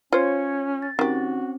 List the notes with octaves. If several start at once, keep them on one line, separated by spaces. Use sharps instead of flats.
C#4 F4 C5 C#5 G#6 C#7
A6
D#3 C4 C#4 F#4 G4